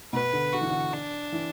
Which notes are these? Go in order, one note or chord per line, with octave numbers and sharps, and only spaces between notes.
B2 B4
D3
D3 F#4
E3
D3
D4
E3